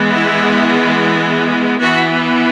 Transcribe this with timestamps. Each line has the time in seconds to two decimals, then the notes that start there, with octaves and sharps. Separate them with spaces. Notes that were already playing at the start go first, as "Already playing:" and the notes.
Already playing: E3 G#3 B3
0.13 E4
1.80 E3 B3 F#4